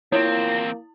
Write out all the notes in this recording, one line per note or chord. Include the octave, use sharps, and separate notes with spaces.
E2 A#3 C4 E4 F4 C#5